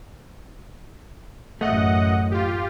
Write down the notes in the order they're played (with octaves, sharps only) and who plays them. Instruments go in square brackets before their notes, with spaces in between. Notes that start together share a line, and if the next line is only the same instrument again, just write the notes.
[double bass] A1 F#2 [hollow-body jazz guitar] A3 [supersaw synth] D#5 F#5
[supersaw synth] F4 G4